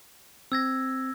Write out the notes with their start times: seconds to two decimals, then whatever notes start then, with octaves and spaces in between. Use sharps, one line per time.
0.52 C4 E6 G#6 A#6